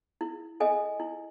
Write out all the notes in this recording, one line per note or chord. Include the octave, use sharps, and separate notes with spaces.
E4
A4 D#5 G#5
E4